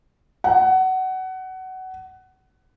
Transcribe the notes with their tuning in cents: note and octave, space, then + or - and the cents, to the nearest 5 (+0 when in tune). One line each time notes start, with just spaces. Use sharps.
F#5 +20